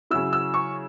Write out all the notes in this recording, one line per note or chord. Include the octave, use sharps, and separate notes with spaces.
C#3 F#3 E4 E6
E6
C#6